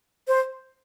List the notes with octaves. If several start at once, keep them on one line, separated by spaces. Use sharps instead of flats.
C5